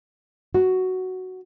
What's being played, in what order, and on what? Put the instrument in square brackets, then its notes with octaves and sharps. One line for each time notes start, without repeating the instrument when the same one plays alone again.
[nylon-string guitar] F#4